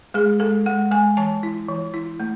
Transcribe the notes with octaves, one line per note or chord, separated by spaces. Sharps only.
G#3 G#4
G#3 A4
G#3 F#5
G#3 G#5
E3 A5
E4
E3
E4
A3